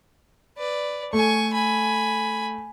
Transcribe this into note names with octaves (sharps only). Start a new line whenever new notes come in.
B4 D5
A3 G#5 C#6
G#5 B5